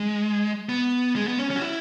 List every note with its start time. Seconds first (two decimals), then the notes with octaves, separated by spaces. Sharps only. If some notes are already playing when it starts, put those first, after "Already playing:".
Already playing: G#3
0.69 B3
1.16 G#3
1.27 B3
1.39 C#4
1.50 C#4
1.56 F#4
1.62 E4